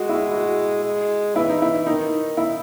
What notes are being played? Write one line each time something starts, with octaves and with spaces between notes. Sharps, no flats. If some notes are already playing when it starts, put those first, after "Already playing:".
Already playing: G#3 F#4
E4
F#4
F#4
G#3
E3 E4
D#4
E4
D#3 D#4
E4